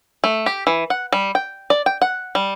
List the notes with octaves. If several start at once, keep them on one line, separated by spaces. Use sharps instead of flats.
A3
G4
E3
F#5
G3
G5
D5
G5
F#5
G3